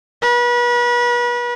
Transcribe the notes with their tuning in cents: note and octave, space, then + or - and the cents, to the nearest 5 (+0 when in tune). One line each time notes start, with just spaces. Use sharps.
B4 -35